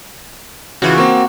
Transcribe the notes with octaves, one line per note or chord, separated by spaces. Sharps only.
C#3 E3 F4 F#4
A#3 C4